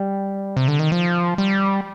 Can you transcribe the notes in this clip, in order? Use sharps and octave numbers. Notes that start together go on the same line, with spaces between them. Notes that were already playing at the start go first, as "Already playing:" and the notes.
Already playing: G3
C3
D3
D#3
F3
G3